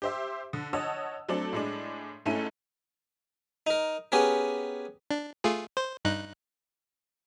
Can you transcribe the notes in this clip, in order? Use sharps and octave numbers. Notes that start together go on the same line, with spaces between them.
G4 C5 E5
D3
C#5 D#5 F#5 A5 D#6 E6
F#3 A3 C4 D4 A4
A2 G#3 D4
G#2 A3 C#4 E4 A4 D#7
D#4 A#4
B3 C#4 G4 G#4 A#4
D4
A3 F4 G#4
C5
G2 D#4 F#6